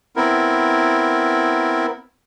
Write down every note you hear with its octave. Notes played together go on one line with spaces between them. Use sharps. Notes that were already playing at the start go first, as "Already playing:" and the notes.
B3 C4 E4 A#4